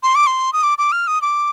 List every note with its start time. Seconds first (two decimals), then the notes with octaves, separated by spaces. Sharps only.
0.03 C6
0.15 D6
0.27 C6
0.53 D#6
0.63 D6
0.78 D6
0.92 F6
1.07 D#6
1.22 D6